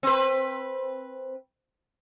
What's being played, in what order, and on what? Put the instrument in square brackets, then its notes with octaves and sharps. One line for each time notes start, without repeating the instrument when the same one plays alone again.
[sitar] C4 B4